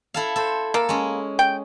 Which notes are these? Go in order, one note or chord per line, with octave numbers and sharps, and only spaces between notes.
E4 A4 F5
A4 C5
A#3 A4
G#3 C#4
G5